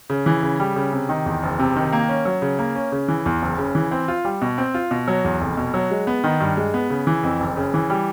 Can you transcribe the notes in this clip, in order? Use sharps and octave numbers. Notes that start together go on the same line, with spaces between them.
C#3
E3
C#3
G3
C#3
C3
D#3
E2
F#1
C3
D#3
A#3
C#4
F#3
C#3
A#3
C#4
C#3
E3
E2
F#1
C#3
E3
C4
F4
G3
B2
C4
F4
B2
F#3
E2
F1
B2
F#3
G#3
B3
D#3
G2
G#3
B3
C#3
E3
F2
F#1
C#3
E3
G3